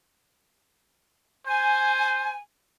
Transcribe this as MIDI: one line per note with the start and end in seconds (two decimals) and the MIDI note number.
1.47 2.33 72
1.47 2.36 80